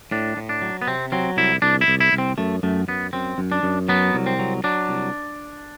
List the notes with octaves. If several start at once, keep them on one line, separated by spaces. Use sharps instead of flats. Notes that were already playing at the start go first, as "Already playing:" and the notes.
A2 D4
A2
D4
F#3
B3
C3 C4
F#3 C4
C2 E4
C2 D4
E4
C2
E4
C2
C4
F#2 A3
F#2 A3
F#2 B3
F#2 C4
F#2
D4
F#2
F#3 B3
C2
C4
F#3
F#3 D4
C2